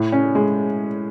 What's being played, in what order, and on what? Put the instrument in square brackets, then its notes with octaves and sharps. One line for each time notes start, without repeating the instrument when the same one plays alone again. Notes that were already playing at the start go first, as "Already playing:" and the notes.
Already playing: [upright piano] A2
C#4
G#3